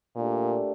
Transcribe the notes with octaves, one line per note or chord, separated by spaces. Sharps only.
A#2 A3 D4 G4 A#4